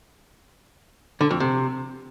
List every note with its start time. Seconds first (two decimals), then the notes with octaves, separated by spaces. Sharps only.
1.21 D3
1.30 F2
1.40 C3